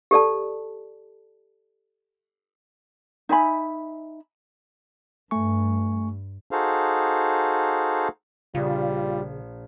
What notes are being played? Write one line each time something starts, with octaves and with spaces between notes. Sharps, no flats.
G4 A4 D5 A5
D#4 E5 G#5 B5
G2 A3 G#5 C#6
D#4 F#4 G#4 A4 C5 F5
A#1 C#3 G3 F4